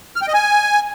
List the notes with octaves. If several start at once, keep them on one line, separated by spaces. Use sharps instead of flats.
F6
G5
D#5
G#5